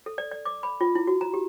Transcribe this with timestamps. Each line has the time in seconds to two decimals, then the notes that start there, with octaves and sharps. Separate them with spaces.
0.06 A4
0.18 D5
0.32 D5
0.45 D6
0.63 B5
0.81 F4
0.95 E4
1.07 F#4
1.21 A#5
1.34 G4